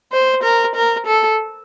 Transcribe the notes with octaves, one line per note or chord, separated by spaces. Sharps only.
C5
A#4
A#4
A4